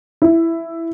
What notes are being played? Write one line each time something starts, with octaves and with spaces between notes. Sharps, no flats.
E4